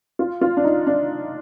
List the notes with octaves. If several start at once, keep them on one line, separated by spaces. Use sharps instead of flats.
F4
F4
D4
D#4
D4